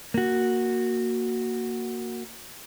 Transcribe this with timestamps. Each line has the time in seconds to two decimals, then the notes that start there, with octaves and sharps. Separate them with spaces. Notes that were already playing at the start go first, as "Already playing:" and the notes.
0.14 A#3 F#4